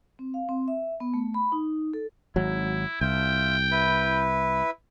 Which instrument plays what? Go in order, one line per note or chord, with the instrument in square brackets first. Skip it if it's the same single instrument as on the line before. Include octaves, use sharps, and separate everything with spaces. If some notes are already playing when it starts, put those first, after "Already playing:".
[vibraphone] C4
F5
C4
E5
B3
A3
B5
D#4
A4
[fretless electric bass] G#1 F#3 [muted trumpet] E4
[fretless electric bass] C2 [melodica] F4 E5 [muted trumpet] G5
[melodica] E4 B4